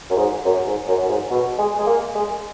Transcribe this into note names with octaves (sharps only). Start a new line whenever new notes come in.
F#2
G#2
F#2
G#2
F#2
F#2
G#2
B2
G#3
G#3
A#3
G#3